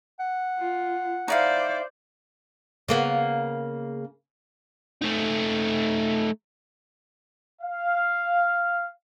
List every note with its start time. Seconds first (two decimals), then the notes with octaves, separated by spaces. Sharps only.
0.20 F#5
0.59 F4
1.28 D#4 E4 C5 D5 F5
2.88 C#3 A#3 B3
5.02 A3 D#4
7.62 F5